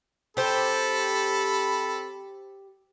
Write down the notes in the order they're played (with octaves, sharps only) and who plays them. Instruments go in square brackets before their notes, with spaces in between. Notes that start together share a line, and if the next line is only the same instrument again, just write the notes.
[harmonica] C4 A4 B5 [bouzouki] G4 C5